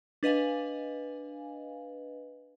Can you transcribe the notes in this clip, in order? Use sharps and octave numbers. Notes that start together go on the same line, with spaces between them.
D4 B4 D#5 F5 G#5